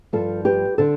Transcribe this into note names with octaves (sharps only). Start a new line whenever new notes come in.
G2 F3 F4 A4
G4 B4
D3 A4 C5